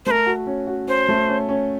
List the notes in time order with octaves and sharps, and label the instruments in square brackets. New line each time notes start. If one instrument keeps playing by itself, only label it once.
[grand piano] A3 [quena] A#4 C5
[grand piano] F#4
C#4
F#4
[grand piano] C#4 [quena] C5
[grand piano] A3
C#4
C#4